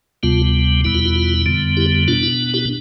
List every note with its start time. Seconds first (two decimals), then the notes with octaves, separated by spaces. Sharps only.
0.23 D2 C3 G3 B3 F4
0.84 E2 B2 G3 B3 E4
0.95 F4
1.05 F4
1.16 F4
1.46 F2 D3 G3 B3
1.77 E4 G4
2.08 B2 B3 D4 F4
2.23 E4
2.54 E4 G4